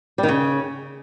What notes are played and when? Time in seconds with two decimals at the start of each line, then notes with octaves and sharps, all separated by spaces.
0.18 G3
0.23 D#3
0.28 C#3